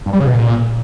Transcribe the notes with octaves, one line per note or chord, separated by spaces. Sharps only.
G2
G3
C#3
B2
A#2